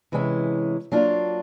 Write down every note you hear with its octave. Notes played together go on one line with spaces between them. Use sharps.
C3 E3 G#3 C#4
F#3 A#3 D4 F4